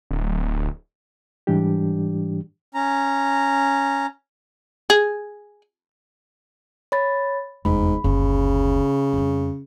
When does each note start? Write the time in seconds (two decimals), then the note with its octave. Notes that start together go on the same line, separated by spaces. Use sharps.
0.11 D1
1.47 G#2 E3 G3 D4 G4
2.75 C#4 A#5
4.90 G#4
6.92 C#5 B5 A6
7.65 F1 E2 G#2 B5
8.04 F#1 D2 C#3
9.13 F2 G3